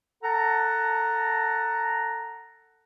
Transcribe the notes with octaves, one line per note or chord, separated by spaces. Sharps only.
A4 F#5 A5 A#5